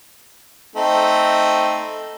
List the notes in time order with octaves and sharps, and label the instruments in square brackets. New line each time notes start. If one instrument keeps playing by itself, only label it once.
[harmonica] A3 C4 D#4